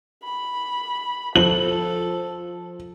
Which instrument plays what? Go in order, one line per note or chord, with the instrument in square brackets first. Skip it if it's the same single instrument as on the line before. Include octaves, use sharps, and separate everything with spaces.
[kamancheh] B5
[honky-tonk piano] F3 F#7 [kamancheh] A4